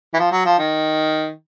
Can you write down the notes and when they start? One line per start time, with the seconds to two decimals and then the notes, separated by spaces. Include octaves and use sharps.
0.14 E3
0.19 F3
0.32 F#3
0.45 F3
0.58 D#3